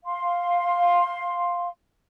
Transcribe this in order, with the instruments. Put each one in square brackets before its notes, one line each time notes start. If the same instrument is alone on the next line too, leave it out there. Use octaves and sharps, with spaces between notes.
[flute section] F5 C6